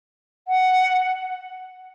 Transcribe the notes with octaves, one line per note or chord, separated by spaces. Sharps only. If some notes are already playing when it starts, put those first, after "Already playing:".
F#5